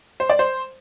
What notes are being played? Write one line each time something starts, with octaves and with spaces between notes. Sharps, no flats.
C5
D5
C5